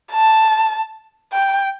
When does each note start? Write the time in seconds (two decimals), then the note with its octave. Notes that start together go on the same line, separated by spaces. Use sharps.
0.13 A5
1.33 G5